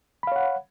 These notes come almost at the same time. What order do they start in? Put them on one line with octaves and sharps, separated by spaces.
B5 F5 C#5 F#5